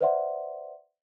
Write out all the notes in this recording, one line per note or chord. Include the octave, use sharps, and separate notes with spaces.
B4 C5 D5 E5 F#5 C6